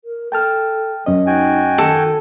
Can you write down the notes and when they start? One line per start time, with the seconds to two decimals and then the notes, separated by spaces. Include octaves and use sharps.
0.05 A#4
0.32 A4 G5 A5 F6
1.06 F#2 C#4 D#5
1.26 D#4 F#4 G5 G#5
1.78 D#3 A4